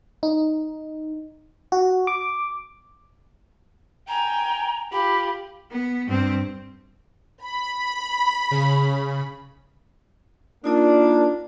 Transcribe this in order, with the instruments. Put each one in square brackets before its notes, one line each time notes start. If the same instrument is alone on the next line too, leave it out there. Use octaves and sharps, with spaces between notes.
[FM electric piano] D#4
F#4
D6
[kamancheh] G5 G#5 [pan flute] A#5
[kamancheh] F4 G4 [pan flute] B5
[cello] B3
G2 C4
[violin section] B5
[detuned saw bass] C#3
[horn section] A#3 D4 [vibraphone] D#4 F4 D5